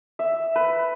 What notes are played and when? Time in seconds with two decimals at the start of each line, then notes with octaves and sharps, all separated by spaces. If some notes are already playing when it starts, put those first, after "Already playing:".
0.19 E5
0.56 B4